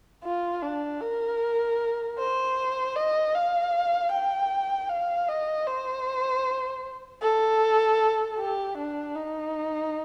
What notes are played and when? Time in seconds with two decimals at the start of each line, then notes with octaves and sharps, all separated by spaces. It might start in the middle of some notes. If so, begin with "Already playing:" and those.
0.24 F4
0.62 D4
1.01 A#4
2.18 C5
2.96 D#5
3.34 F5
4.12 G5
4.89 F5
5.29 D#5
5.67 C5
7.22 A4
8.39 G4
8.78 D4
9.16 D#4